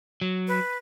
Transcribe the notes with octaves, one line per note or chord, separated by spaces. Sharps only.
F#3
B4